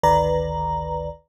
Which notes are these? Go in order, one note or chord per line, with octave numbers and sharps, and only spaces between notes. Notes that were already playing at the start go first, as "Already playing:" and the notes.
G#1 D2 D#3 B4 D5 A#5